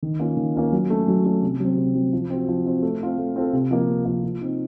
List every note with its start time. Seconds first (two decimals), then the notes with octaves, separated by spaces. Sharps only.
0.03 D#3
0.20 A#3 C#4 F4
0.37 D#3
0.55 A#3 C#4 F4
0.73 F#3
0.90 A3 C#4
1.08 F#3
1.25 A3 C#4
1.42 C3
1.60 F#3 C4
1.77 C3
1.95 F#3 C4
2.13 F3
2.30 C4 F#4
2.48 F3
2.65 C4 F#4
2.82 A3
3.01 C4 F4 A4
3.18 A3
3.36 C4 F4 A4
3.53 C3
3.71 F3 A#3
3.89 C3
4.05 F3 A#3
4.24 F3
4.41 C4 D#4